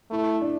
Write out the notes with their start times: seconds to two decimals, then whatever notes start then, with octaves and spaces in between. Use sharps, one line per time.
0.11 A3 E4
0.41 D4